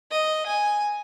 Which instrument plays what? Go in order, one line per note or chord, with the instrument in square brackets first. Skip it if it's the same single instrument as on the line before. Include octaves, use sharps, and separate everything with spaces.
[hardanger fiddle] D#5
G#5